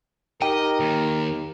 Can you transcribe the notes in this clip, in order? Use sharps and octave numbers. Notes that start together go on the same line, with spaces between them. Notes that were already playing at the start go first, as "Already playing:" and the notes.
D#4 G4 A#4 D#5 G5
D#2